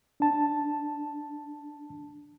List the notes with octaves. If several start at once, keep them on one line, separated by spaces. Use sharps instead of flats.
D4 A5